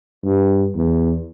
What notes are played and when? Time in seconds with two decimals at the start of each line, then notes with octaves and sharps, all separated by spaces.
0.23 G2
0.75 E2